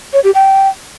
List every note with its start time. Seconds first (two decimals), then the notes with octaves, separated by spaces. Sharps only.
0.13 C#5
0.24 G4
0.35 G5